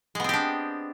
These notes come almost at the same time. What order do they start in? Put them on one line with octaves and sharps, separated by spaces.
G#3 B3 C4 G4 D4